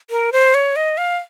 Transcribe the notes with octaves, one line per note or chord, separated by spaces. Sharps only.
A#4
C5
C#5
D#5
F5